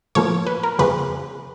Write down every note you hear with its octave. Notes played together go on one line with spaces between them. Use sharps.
A2 F3 A#3 C#5
B4
A#4
F2 C#3 F3 A#3 B4